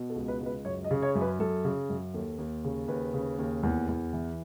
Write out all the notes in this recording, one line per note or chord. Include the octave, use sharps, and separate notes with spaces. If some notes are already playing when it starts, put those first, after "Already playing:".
Already playing: B2
A4
C#2
B4
C#2
B4
F#2 C#5
D#5
C#3
C#5
F#2
B4
F#2 A4
C#3
F#2
D#2 A4
D#2
C#3
D#2 B4
C#3
D#2
E2
E2
E3